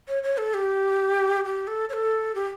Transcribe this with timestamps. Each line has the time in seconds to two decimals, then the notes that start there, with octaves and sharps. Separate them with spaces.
0.08 C#5
0.23 C#5
0.38 A4
0.54 G4
1.45 G4
1.67 A4
1.89 C#5
1.93 A4
2.35 G4